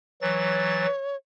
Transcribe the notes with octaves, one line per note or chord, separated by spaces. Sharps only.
E3 F#3 C#5 A6